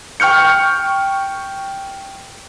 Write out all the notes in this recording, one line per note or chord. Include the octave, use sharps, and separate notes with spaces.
G5 C#6 F6 G6 C#7